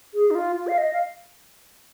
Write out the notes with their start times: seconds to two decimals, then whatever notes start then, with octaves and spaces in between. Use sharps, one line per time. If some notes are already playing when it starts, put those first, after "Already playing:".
0.14 G#4
0.31 D#4
0.35 F4
0.56 F4
0.68 F5
0.78 D#5
0.93 F5